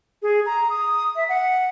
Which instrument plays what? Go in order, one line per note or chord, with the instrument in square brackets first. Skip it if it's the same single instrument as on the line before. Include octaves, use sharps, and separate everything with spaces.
[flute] G#4
A#5
D#6
E5
F#5